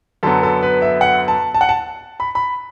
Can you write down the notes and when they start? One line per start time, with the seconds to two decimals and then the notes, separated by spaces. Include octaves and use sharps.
0.23 F#2 D3 F#3 B3 A4
0.43 A4
0.63 B4
0.82 E5
1.01 F#5
1.28 A5
1.55 A5
1.61 F#5
1.69 A5
2.20 B5
2.35 B5